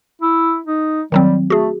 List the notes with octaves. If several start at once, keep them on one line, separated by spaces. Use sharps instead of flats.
E4
D#4
D#3 F#3 G3 C4
A3 F#4 G#4